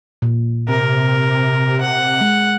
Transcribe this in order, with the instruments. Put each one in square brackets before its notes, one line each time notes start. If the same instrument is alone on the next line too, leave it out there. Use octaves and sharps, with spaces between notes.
[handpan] A#2
[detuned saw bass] C3 [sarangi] A#4
[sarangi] F#5
[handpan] G#3